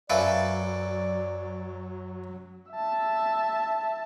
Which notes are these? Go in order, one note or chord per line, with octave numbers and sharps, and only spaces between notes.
F#2 F#3 A4 B4 D5 E5 F5
E5 A5